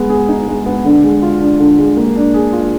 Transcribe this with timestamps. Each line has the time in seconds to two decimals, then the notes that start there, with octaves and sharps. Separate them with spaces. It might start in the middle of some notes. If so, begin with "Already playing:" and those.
Already playing: G#3 B3
0.10 G#4
0.28 D#4
0.48 G#3
0.66 B3
0.85 D3
1.03 G#3
1.22 F4
1.41 D4
1.59 D3
1.78 G#3
1.97 A#3
2.16 D4
2.34 G#4
2.52 F4